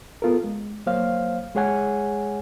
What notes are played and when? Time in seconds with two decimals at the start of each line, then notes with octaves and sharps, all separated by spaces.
0.22 B3 F4 A4 A#4
0.44 G#3
0.86 F#3 A#3 C5 C#5 F5
1.55 G#3 G#4 C#5 F#5 G#5